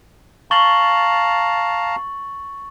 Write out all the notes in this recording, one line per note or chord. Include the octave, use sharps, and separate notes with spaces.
F5 A5 A#5 C#6 A6 F#7